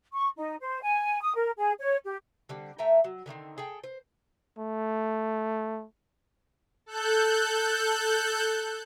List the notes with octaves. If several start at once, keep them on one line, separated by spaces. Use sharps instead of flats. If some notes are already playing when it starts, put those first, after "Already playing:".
C#6
D#4
C5
G#5
D#6
A#4
G#4
C#5
G4
D3 G3 C4
A3 E5 G5 A#5
F#3
D3 D#3 B3 C4
G#4 A4 G5
C5
A3
A4 F#6 G6